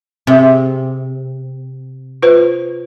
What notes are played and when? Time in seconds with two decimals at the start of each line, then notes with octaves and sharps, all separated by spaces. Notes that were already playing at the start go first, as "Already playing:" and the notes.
0.27 C3 C4 G#4
2.22 F4 B4 C5